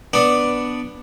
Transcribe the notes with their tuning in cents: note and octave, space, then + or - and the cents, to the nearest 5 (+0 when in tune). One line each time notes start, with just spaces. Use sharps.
B3 +0 D4 +0